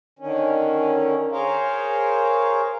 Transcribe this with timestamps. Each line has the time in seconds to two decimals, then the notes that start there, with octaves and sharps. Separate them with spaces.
0.19 D3 D#3 C#4
1.32 G#4 A#4 C5 C#5 F5